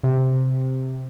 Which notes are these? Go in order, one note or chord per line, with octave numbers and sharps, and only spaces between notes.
C3